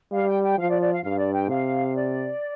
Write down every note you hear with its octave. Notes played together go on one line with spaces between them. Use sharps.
G3 F5
G5
G5
F3 F5
D5
D5
F5
G2 F5
D5
G5
C3 F5
D5